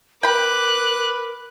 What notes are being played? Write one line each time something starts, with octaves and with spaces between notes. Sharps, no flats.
A#4 B4 G5 B5 D6 F#6